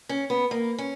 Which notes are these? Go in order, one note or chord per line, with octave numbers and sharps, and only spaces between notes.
C#4
B3
A#3
C#4